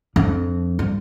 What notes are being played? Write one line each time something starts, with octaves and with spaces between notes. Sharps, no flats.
F2 D4
G2